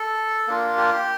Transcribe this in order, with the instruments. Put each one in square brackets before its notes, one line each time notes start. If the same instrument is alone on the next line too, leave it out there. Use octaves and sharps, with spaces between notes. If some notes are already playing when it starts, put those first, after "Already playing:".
Already playing: [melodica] A4
A#3 D4 F4
G4